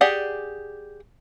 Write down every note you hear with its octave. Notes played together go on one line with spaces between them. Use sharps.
G4 G#4 D5 F#5